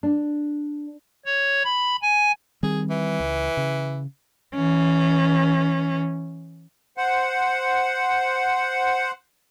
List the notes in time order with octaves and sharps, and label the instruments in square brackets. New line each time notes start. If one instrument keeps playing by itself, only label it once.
[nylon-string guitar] D4
[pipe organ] C#5
B5
G#5
[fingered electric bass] D#3 G3 C4 [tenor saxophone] G#4
[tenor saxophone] E3
[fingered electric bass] C#2
C#3
[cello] E3 C#4
[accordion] C5 F#5